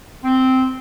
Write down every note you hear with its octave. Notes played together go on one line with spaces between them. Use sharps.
C4